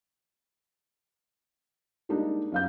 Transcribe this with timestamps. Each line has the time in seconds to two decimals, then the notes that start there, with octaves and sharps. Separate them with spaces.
2.09 G3 G#3 A#3 D4 D#4
2.52 F#2 F5 G6